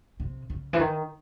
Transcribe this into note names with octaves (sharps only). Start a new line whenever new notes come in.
C3
C#3
E3
D#3